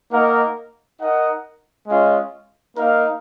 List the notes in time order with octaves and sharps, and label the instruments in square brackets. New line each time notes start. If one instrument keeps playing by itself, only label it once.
[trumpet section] A#3 D#4 A#4 D#5 F#5
D#4 A#4 D#5 F#5
G#3 C#4 F4
A#3 D#4 A#4 F5